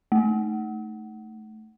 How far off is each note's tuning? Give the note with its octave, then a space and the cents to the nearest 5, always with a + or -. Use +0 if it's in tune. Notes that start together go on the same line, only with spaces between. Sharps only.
A3 -5